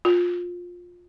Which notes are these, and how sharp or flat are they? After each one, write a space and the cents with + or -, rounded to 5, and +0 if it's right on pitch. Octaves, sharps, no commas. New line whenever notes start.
F4 +20